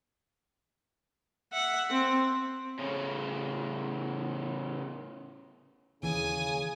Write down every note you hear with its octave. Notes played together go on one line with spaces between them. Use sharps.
E5 F#5
C4
A2 C#3
D#2 C#3 E3 G#5 D#6